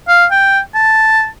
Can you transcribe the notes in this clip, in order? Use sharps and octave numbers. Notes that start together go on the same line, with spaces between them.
F5
G5
A5